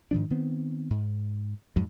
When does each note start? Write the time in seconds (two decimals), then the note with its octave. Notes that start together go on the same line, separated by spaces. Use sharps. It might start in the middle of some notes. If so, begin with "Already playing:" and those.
0.11 G#2 D#3 F3 D4
0.30 D#3 B3 C4
0.90 G#2
1.76 F2 G#2 F#3 G#3